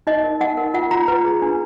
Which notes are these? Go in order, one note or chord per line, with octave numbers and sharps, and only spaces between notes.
D#4 D#5
A#4
D#4 F#5
A#4
F4 F#5
F4 A#5
B4
G#4
D4